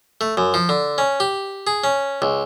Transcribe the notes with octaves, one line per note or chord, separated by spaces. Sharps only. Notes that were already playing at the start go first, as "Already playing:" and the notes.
A3
F#2
F3
D3
C#4
G4
G#4
C#4
C#2